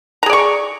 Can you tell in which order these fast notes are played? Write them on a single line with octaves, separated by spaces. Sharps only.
A#5 G#4 D5 C#6